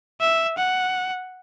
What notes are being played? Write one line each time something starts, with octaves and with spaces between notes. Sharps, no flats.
E5
F#5